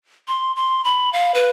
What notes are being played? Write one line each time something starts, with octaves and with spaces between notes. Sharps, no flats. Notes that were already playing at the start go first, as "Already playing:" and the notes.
C6
C6
B5
F5
B4